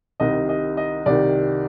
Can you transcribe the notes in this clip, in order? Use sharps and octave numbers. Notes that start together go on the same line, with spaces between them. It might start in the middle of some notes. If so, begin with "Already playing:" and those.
C2 C3 D#3 D#5
D#5
D#5
C2 C3 D#3 D5